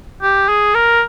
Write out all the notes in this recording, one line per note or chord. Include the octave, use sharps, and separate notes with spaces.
G4
G#4
A#4